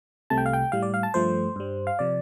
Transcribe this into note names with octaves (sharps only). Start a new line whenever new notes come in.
C2 C3 A3 A5
G5
F5
G5
A2 G3 F5
D5
F5
A5
G2 F3 A3 C5
G2 G3
F5
C3 F3 D5